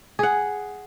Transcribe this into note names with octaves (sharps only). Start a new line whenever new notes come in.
G#4 F#5